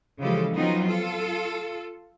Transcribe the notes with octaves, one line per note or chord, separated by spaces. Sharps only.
C#3 E3 F3 G#3 G4 A4
F3 F#3 B3 C4 D#4 F4
F4 A4